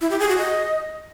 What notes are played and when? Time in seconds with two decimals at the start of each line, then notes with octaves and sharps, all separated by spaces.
0.01 E4
0.10 G4
0.20 G#4
0.29 F#4
0.38 D#5